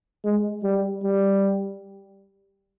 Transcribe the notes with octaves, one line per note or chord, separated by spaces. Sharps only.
G#3
G3
G3